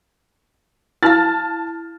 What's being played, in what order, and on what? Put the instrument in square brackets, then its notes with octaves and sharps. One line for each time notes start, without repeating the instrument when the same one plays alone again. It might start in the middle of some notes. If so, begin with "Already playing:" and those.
[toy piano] E4 F5 [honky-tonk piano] A5 F6 A6